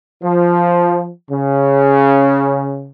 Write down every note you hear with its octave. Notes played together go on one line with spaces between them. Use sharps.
F3
C#3